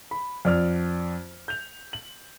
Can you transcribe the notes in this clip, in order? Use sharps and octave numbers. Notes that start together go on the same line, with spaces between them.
B5
F2 D5 F6
G6 F7
F#7